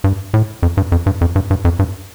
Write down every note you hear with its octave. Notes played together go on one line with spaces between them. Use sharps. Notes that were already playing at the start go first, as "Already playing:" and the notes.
G2
A2
F2
G2
F2
G2
F2
G2
G2
F2
G2